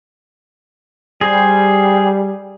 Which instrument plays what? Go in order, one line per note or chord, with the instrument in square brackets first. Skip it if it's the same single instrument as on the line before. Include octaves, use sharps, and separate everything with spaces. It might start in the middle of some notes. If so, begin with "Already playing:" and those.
[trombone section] G3 [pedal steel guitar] G#4 C5